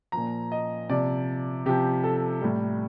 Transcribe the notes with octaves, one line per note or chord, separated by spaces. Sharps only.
A#2 F3 A#5
D#5
C3 F3 D5
C3 F3 G4
A4
A2 G3